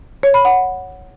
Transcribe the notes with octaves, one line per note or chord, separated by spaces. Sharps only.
C#5
B5
F#5